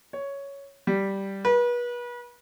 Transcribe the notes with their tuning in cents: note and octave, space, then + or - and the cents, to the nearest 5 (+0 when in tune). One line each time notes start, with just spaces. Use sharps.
C#5 +5
G3 -5
B4 -35